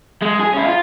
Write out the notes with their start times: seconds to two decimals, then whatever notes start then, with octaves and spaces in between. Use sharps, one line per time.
0.22 G#3
0.40 G#4
0.54 C#4 E4
0.65 F4